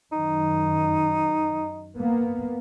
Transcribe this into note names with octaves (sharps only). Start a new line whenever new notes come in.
F#2 D#3 D#4
A#3 B3